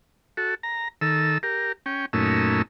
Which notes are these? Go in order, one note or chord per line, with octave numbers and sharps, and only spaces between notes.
F#4 A4
A#5
D#3 A4 E6
G4 A#4
C#4 G5
F#2 A#2 A3 C#4 D#4 E6